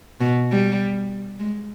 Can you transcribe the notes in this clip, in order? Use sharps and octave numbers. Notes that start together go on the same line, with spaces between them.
B2
G3
G#3